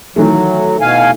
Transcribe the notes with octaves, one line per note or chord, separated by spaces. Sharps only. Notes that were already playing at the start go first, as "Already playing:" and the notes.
D#3 E3 F#3 A3
B2 F5 G#5